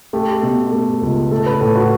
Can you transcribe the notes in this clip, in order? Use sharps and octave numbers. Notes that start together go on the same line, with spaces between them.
A3 G4
B2
A3
C#2
A3 A4
B4
A2 A4
F#4